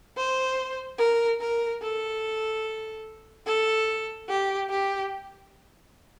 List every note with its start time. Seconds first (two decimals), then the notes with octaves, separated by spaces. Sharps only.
0.17 C5
0.98 A#4
1.41 A#4
1.82 A4
3.46 A4
4.29 G4
4.70 G4